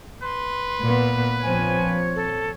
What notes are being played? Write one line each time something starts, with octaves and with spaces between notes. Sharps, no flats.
B4 C6
A#2 B3
A#1 F3 C4 C#5 G#5
A4